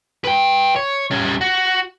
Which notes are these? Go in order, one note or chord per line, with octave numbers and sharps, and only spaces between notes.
B4 G5
C#5
G3 C#4
F#4